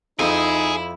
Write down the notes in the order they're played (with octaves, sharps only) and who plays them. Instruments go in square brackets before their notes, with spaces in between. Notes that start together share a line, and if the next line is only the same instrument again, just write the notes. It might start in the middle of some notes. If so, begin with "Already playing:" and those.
[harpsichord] F2 [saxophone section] D#4 [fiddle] E4 [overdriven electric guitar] G#4